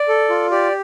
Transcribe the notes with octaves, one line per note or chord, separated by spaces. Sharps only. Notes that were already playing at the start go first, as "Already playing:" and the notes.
Already playing: D5
A4
F4
G4 D5